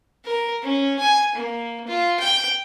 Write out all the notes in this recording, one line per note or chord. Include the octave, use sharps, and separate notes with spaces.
A#4
C#4
G#5
A#3
F4
G5